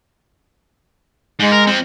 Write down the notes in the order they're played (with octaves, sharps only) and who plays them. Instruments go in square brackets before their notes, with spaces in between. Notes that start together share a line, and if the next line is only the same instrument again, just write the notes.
[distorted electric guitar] G#2 [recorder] G#3
[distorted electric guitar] A#4
F3 C4